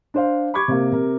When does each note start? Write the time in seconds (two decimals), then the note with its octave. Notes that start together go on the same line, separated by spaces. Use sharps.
0.14 D4 C5 F5
0.54 B5 C#6 D6 G#6
0.68 C3 A#3
0.92 C3 A#4